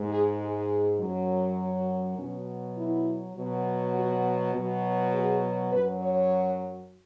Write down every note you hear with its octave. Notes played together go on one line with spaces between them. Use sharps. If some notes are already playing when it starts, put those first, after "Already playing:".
Already playing: G#2 G#3
G#4
G#4
F#2 F#3
B2 F#3 C#4
E4
B2 F#3
F#4
B2 F#3
G#4
F#2 F#3 B4
C#5